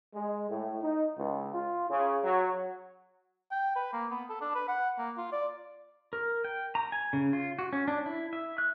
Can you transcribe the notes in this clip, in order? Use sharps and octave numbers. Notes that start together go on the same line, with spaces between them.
G#3
A2
D#4
C#2
F4
C#3
F#3
G5
B4
A#3
B3
A4
D4
B4
F#5
A#3
F4
D5
A#4
G5
A#5
G#5
C#3
F4
F#4
C#4
D4
E4
E5
F#6